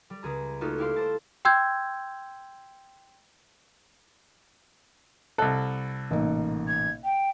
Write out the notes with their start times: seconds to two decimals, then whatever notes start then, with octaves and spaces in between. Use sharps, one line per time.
0.10 G3
0.23 C#2 G#4 A#5
0.61 A3 A#3 C#4 D#4 F4 F#4
0.78 E4 G4 F5 C6
0.96 C5 A5
1.45 G5 C6 E6 G6 G#6
5.38 C2 A4 F#6
6.11 A1 A#2 D#4
6.68 G#6
7.04 G5